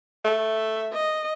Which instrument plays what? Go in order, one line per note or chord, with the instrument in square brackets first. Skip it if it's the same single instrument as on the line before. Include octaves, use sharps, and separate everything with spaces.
[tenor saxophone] A3
[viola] E5
D#5